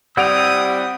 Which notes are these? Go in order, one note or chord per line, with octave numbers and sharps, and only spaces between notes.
G3 C4 E4 F#5 D#6 E6 D7 F7